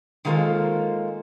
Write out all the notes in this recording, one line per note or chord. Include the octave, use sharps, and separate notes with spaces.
D#3 G#3 A#3 F4 A4 C5